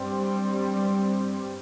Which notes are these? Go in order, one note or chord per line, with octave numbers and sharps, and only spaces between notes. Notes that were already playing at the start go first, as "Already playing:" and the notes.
Already playing: G2 G3 C4